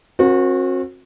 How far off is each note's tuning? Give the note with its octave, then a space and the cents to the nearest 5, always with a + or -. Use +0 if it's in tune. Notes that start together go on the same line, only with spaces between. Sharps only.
C4 +40 F#4 -25 A#4 +15